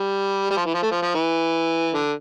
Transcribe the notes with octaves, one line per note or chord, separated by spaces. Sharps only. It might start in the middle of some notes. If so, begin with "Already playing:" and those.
Already playing: G3
G3
F3
E3
F3
A3
F3
F3
E3
D3